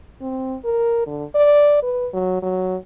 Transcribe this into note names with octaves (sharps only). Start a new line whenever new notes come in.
C4
A#4
D3
D5
B4
F#3
F#3